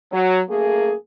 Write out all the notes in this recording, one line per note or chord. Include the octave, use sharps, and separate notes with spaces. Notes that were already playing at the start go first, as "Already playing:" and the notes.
F#3
F#2 A3 A#3 G#4